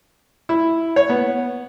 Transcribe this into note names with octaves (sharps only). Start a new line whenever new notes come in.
E4
C#5
B3